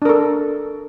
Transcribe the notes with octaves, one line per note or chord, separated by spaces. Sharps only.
D4 A4 A#4